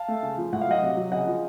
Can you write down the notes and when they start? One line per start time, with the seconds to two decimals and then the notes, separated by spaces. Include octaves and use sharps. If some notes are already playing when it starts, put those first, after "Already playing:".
Already playing: F5 A5
0.08 A3
0.23 C#3
0.38 F3
0.52 A2 F#5
0.62 F5
0.67 F#3 D#5 F#5
0.83 C3
0.97 F#3
1.12 C#3 D#5 F#5
1.27 F3